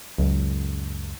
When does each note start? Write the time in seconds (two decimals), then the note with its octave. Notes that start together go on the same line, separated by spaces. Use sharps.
0.18 C#2 F#2